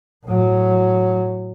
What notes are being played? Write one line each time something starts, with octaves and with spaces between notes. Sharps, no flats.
A2 F#3